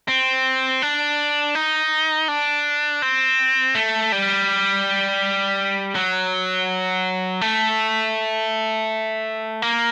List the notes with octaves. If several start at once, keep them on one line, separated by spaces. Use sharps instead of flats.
C4
D4
D#4
D4
C4
A3
G3
F#3
A3
A#3